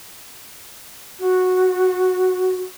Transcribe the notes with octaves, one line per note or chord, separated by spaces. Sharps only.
F#4